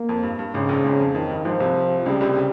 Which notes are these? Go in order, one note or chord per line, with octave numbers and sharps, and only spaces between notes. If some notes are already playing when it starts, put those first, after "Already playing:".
Already playing: A#3
F2
G2
G2
G#1 G#2 C#3
A#1 A#2
G#1 G#2
F2
F2 D#3
G2
G#1 G#2 F3
C2 C3
C#2 C#3 G3
C2 C3
C#3